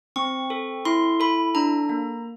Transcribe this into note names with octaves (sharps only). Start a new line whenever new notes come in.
C4 C#6
A4
E4 C6
A4 B5
D4 A#5
A#3